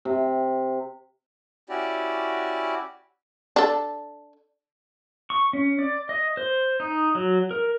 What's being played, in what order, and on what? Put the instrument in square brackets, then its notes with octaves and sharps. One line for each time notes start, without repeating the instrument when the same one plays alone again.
[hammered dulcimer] C3
[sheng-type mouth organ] C#4 E4 F#4 G4 D5
[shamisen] D4 A4
[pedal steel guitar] C#6
C#4
D5
D#5
C5
D#4
F#3
A#4